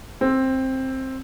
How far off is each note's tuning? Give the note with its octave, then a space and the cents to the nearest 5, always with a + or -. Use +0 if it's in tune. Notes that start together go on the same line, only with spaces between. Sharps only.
C4 +10